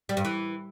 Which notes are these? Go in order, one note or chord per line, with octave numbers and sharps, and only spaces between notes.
G3
G2
E3